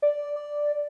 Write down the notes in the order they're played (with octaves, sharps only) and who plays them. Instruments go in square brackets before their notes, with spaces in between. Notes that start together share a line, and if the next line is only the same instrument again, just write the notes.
[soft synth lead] D5
D5